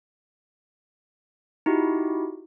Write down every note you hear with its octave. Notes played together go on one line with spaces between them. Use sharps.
D#4 E4 F#4 G4